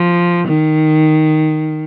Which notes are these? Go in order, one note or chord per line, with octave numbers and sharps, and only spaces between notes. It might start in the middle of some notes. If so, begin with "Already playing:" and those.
Already playing: F3
D#3